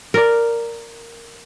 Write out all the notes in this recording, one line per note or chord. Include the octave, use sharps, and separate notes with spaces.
A#4 D5